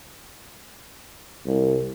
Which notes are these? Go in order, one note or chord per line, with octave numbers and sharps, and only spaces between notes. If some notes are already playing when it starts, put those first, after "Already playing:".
C2